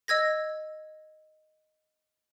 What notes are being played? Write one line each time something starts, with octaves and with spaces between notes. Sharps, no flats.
D#5 E6 G#6 A#6